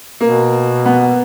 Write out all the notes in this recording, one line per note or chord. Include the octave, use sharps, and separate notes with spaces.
B2 A#3
B3